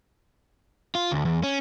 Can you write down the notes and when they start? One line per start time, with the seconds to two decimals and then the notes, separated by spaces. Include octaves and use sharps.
0.95 F4
1.12 D2
1.25 E2
1.43 C#4